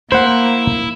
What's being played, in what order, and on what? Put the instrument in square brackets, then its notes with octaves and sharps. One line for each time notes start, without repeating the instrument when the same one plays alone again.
[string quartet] A#3 [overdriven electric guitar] E4 [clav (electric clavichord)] C5 F#5